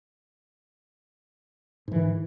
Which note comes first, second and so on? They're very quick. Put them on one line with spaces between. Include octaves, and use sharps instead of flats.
G#2 E3 D#3